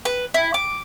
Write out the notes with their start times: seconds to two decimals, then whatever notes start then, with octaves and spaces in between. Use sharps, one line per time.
0.05 B4
0.34 E4
0.54 D6